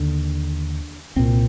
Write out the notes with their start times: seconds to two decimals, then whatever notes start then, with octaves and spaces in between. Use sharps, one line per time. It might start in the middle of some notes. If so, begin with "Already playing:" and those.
Already playing: D#2 D3 D4
1.16 C2 A#2 C4